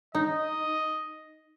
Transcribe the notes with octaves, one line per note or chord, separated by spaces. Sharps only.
D#4 D#5